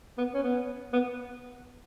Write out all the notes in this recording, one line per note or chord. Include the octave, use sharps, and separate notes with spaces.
B3
C#4
B3
B3